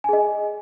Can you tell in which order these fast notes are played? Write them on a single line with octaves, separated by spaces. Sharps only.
G#5 G#4 D#5